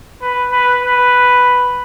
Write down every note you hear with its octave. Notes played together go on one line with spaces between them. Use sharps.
B4
B4
B4